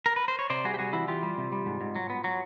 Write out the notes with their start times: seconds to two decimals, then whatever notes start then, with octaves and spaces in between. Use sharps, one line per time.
0.06 A#4
0.16 B4
0.28 C5
0.39 C#5
0.50 C3 C5 D5
0.64 G3 F#4 G#4
0.74 G4
0.79 G3 F#4 G#4
0.93 E3 E4 F#4
1.08 E3 F4 G4
1.23 G3
1.38 C3
1.52 G3
1.66 G#2
1.81 G#2
1.95 F#3
2.10 B3
2.24 F#3